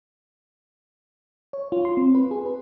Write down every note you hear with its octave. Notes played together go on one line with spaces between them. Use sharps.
C#5
F4
C6
C4
B4
G#4
B4